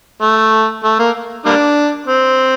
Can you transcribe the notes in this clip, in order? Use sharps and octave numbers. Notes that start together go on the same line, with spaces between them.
A3
A3
A#3
G3 A#3 D4
C4